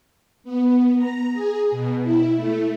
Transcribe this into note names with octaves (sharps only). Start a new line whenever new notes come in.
B3
A#5
G#4
B2
E4
A3